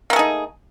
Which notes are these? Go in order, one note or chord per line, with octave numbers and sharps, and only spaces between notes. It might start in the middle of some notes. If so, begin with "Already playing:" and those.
A3 A#3 D#4 G#4